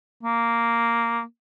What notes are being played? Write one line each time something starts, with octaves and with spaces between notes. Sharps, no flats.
A#3